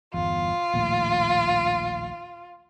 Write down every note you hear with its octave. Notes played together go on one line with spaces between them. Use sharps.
G1 E2 F4
A#1 D#2 A2